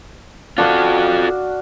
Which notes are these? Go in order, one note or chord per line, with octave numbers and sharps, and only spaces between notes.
D4 F4 F#4 A4 F5